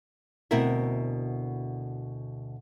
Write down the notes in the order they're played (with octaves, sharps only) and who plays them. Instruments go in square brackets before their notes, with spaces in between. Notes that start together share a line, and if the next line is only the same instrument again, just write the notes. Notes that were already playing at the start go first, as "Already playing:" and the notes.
[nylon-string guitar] D2 B2 C4 E4 A#4 E5